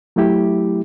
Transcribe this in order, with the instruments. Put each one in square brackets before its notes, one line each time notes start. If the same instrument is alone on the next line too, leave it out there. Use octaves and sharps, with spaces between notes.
[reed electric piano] F#3 A3 E4 G4